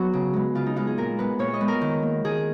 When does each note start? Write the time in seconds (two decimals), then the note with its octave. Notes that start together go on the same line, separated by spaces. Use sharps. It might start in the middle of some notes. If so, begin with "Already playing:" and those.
Already playing: F#3 B3 F#4 C#5
0.13 C#3
0.34 G#3 B3
0.55 C#3 F4
0.66 D#4
0.76 G#3 B3 F4
0.87 G#4
0.98 A#2 A#4
1.19 G#3 B3 B4
1.39 A#2 C#5
1.54 D#5
1.61 G#3 B3
1.68 A#4
1.81 D#3
2.03 A#3
2.25 D#3 G#4